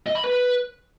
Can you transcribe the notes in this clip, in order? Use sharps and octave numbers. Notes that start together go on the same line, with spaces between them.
D#5
B5
B4